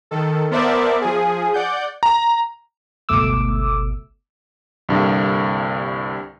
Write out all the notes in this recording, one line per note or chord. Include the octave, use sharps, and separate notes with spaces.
D#3 A4
B3 A#4 C5 D5 E5 A5
F3 G#4
D5 F#5 G6
A#5
G1 C#2 B2 A3 D6 E6
C2 G2 D3 A#3